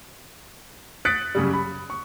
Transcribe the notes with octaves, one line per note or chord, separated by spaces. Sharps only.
D#6 F#6 A6 B6 C#7 D7
F#2 C#3 G3
B5
C#6